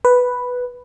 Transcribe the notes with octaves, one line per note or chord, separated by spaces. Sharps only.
B4